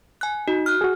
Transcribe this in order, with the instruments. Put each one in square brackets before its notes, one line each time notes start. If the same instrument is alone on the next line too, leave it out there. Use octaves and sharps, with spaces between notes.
[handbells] G#5 F#6
[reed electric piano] D#4 [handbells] F#4
[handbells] F6 F#6
[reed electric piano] F#4 G#4